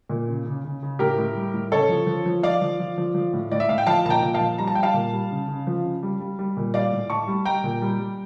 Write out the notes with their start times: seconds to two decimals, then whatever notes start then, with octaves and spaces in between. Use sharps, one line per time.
0.09 A#2
0.28 C#3
0.45 C#3
0.64 C#3
0.82 C#3
0.99 A2 G4 A#4
1.18 A2
1.35 G3
1.54 A2
1.72 C#3 A4 C#5
1.89 F3
2.07 F3
2.26 F3
2.43 F3 D5 F5
2.62 F3
2.80 F3
2.98 F3
3.15 F3
3.33 A2
3.52 A2 D5
3.60 E5
3.69 A2 F5
3.78 G5
3.87 F3 F5 A5
4.06 A#2 A5
4.10 G5 A#5
4.22 A#2
4.34 F5 A5
4.40 F3
4.58 G3 A#5
4.67 A5
4.75 G3 G5
4.83 F5 A5
4.94 A#2
5.13 G3
5.31 C#3
5.48 C#3
5.67 F3
5.85 C#3
6.03 G3
6.20 G3
6.39 G3
6.57 A#2
6.74 G3 D5 F5
6.92 A2
7.10 A2 A5 C#6
7.27 G3
7.45 G3 G5 A#5
7.64 A#2
7.82 G3
8.00 G3